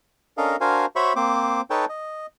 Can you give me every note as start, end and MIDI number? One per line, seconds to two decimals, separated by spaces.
0.38 0.56 61
0.38 0.56 62
0.38 0.56 69
0.38 0.56 70
0.38 0.56 75
0.38 0.56 77
0.61 0.86 62
0.61 0.86 66
0.61 0.86 70
0.61 0.86 72
0.61 0.86 77
0.61 0.86 80
0.96 1.13 66
0.96 1.13 72
0.96 1.13 73
0.96 1.13 76
0.96 1.13 83
0.96 1.13 85
1.16 1.61 58
1.16 1.61 60
1.16 1.61 72
1.16 1.61 86
1.70 1.85 63
1.70 1.85 69
1.70 1.85 71
1.70 1.85 73
1.70 1.85 79
1.70 1.85 81
1.89 2.26 75